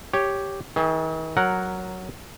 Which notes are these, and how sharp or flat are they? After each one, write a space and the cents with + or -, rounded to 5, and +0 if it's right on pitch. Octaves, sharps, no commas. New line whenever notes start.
G4 +0 C#5 +0
D#3 +45 G#4 +20
F#3 +0 A#4 +0 F#5 +0